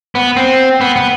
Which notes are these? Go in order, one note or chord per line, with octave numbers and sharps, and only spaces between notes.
B3
C4
B3
B3